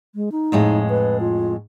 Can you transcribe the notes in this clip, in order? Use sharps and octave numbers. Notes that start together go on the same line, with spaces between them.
G#3
D#4
F2 A2 G#3
B4
F4